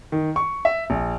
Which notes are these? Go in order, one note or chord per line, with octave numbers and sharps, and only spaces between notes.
D#3
C#6
E5
A#1